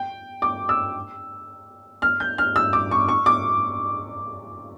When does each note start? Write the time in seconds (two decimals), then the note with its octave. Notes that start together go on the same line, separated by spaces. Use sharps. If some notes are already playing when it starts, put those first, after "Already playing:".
Already playing: G5
0.42 D6
0.69 E6
2.02 F6
2.20 G6
2.38 F6
2.56 E6
2.73 D6
2.91 C#6
3.08 C#6
3.26 D6